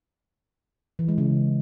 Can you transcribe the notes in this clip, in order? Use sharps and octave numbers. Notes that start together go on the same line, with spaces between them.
E3
G#3
C#3